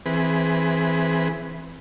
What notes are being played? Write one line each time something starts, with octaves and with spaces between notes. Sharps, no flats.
E3 C4 G#4 B4